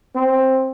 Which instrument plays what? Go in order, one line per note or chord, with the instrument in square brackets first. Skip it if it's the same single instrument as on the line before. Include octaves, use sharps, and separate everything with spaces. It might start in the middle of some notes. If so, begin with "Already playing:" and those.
[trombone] C4